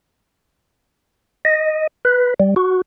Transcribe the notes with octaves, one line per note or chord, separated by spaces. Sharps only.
D#5
B4
G3
F#4